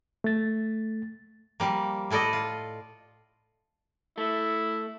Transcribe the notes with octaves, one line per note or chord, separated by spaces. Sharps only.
A3 A6
F3 G3 A#3
A2 E4 A4 D5 D#5
F4
A3 E4